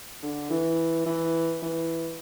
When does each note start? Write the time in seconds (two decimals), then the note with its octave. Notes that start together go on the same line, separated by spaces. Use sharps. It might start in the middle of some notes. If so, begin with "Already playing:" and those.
0.23 D3
0.50 E3
1.06 E3
1.62 E3